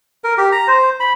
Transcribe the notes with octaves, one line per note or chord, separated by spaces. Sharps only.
A#4
G4
A#5
C5
B5